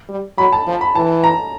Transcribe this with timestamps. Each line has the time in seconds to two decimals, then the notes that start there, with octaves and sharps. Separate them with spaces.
0.09 G3
0.37 F#3 B5
0.53 A5
0.67 F3
0.81 B5
0.95 E3 A5
1.24 A#5